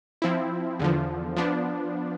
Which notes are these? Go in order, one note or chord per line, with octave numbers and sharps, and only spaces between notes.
F3 C4 E4
E2 D3 F3
F3 B3 D4